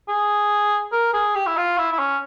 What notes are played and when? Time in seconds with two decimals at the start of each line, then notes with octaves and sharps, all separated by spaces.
0.08 G#4
0.92 A#4
1.13 G#4
1.35 G4
1.46 E4
1.57 F4
1.78 E4
1.92 E4
1.99 C#4